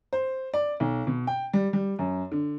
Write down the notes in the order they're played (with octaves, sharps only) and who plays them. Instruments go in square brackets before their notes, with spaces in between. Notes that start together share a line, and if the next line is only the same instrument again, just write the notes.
[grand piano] C5
D5
B1
B2
G5
G3
G3
F#2
D3